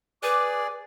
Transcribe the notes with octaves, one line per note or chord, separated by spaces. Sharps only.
G#4 B4 D5 D6